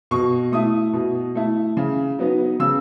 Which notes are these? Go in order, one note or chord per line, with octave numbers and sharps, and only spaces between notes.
B2 C#6
A3 E4 D#6
B2
A3 E4
C#3
F#3 B3 D#4
C#3 E6